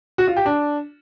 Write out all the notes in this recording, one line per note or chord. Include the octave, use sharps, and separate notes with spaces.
F#4
F4
G4
D4